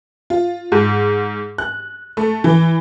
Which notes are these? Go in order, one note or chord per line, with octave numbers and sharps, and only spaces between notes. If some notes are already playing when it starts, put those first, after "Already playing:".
F4
G#2
F#6
A3
E3